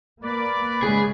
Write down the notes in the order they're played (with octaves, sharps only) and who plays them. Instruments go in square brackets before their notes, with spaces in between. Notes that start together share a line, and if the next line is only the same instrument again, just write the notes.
[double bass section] A#3 [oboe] B4 [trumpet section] D5
[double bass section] C#3 G#3 [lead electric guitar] G#4